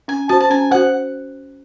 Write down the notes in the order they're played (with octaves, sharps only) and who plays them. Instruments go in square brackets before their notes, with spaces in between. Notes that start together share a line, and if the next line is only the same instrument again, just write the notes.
[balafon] C#4 [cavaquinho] G#5
[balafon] F#4 C5 [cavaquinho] A5
[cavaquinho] A5
[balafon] C#4 [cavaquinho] G#5
[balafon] F#4 C5 [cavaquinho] F#5